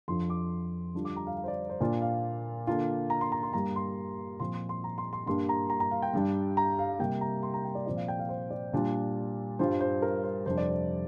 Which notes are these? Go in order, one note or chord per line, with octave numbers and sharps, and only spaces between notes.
F2 F3 D4 F4 C6
D6
D3 G3 D4 F4
D6
A#5
F5
F5
C5
D5
C5
A#2 A#3 D4 F4 D5
F5
D3 A#3 D4 F4
A#5
C6
A#5
C6
G2 G3 A#3 A#5
C6
A#2 F3 C4 F4 C6
C6
C6
A#5
C6
C6
G2 G3 A#3 D4 C6
A#5
A#5
A#5
F5
G5
G2 G3 D4
A#5
F5
C3 G3 A#3 G5
A#5
C6
A#5
G5
D5
A#2 F3 C4 F4 D5
F5
G5
F5
C5
D5
A#2 G3 D4 F4
G2 G3 D4 F4 C5
C5
A#4
C5
F2 C3 G3 D4 C5
D5
C5